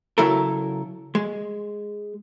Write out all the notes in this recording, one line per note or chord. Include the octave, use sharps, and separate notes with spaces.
C#3 F#3 E4 A4 A#4
G#3